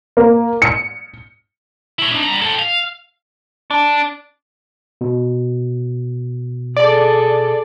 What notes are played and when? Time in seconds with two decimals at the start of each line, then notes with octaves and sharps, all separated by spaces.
0.17 A#3
0.62 C#7
1.99 E4 C#5
2.11 D4 D#4
2.24 G3 A#5
2.42 A4 G5
2.59 F5
3.71 D4
5.01 B2
6.77 G#4 A4 D5